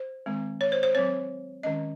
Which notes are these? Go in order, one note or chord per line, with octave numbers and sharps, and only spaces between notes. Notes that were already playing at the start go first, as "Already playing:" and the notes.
Already playing: C5
D#3 G#3 C4
C#5
C5
C5
F#3 C4 C#5
D#3 G#3 C#4 D#5